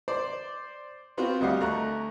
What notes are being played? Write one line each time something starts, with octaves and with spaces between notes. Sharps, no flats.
C5 D5 C6
B3 C4 F4 F#4
D2 G3 D#5 F5 F#5
D2 A3 A#5 C#6 F#6